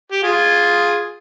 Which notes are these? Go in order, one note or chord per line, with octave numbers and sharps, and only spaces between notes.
G4
F4 G#4